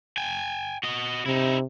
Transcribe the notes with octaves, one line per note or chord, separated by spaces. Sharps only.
G5 G#5
F#4 D#5
C3 D#4 E4